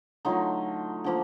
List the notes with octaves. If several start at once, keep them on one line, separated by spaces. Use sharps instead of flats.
D3 F#3 A3 D#4 F4
D3 F3 A#3